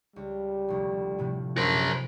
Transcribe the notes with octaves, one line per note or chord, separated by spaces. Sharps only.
C#2 G3
F1 D2
A2 C3 F3
F#2 A#4 C5